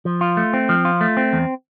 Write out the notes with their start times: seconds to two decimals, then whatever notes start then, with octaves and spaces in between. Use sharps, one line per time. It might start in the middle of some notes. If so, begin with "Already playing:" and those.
0.05 F3
0.21 F4
0.37 A3
0.53 C4
0.69 F3
0.85 F4
1.01 A3
1.17 C4
1.33 E2